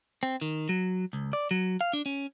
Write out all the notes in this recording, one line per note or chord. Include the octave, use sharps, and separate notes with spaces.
C4
D#3
F#3
C#2
D5
F#3
F5
D4
C#4